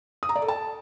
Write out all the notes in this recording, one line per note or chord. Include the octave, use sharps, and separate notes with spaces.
D#6
A#5
D5
A4
A5